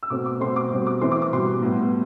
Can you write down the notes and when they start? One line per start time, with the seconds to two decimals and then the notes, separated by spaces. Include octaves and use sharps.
0.03 E6
0.10 B2 A3 C4 D6
0.26 D6
0.40 B2 A3 C4 C6
0.56 D6
0.71 B2 G3 C4
0.87 D6
1.01 E3 A3 C4 C6
1.12 D6
1.22 D6
1.32 B2 G3 B3 C6
1.62 A2 G3 B3